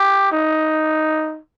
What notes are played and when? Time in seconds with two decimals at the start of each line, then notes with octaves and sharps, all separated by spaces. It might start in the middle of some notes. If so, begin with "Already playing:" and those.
Already playing: G4
0.32 D#4